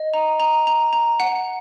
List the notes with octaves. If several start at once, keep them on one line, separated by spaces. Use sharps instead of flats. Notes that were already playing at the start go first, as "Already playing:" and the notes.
Already playing: D#5
A#5
A#5
A#5
A#5
F#5